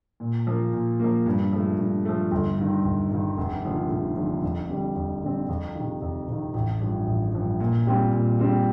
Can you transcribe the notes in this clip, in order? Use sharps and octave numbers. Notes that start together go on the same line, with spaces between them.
A#2
F3 A#3
A#2
F3 A#3
G2
F3 A3
G2
F3 A3
G1
G2 D#3
G1
G2 D#3
F1
D#2 D3 F3
F1
D#2 D3 F3
F2
D3 G3 C4
F2
D3 G3 C4
F2
C3 D#3
F2
C3 D#3
A1
G2 F3
A1
G2 F3
A#2
G3 C4 F4
A#2
G3 C4 F4